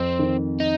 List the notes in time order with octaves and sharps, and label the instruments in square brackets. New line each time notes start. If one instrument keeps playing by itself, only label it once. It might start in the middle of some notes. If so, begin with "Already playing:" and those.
Already playing: [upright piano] F2 [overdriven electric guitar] C4
[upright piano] D#3
[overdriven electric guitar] D#4